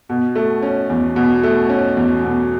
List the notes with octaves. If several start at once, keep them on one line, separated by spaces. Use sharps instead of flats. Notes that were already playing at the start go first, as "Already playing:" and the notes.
B2
A3
C#4
E2
B2
A3
C#4
E2
B2